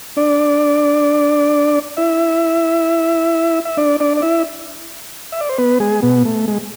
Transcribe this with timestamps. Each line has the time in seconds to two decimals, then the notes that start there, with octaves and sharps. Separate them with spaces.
0.17 D4 D5
1.97 E4 E5
3.65 E5
3.77 D4 D5
4.00 D4 D5
4.17 D5
4.22 E4 E5
5.32 E5
5.41 D5
5.49 C5
5.58 B3 B4
5.80 G#3 G#4
6.02 B2 B3
6.25 A3
6.48 G#3